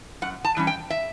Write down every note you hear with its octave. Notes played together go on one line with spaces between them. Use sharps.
F#2 F#5
A5
E3 G3 C#4
G5
E5